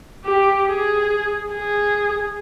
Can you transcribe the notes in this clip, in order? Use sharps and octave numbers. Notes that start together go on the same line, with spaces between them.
G4
G#4
G#4